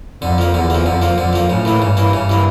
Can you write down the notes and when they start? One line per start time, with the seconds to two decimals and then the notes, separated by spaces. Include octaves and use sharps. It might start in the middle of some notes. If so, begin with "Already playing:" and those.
0.22 F2 D3
0.38 F3 A#3
0.54 E2 D3
0.70 F3 A#3
0.86 F2 D3
1.02 F3 A#3
1.17 F2 D3
1.33 F3 A#3
1.49 A2 C#3
1.65 E3 A#3
1.81 G2 C#3
1.97 E3 A#3
2.13 G2 C#3
2.30 E3 A#3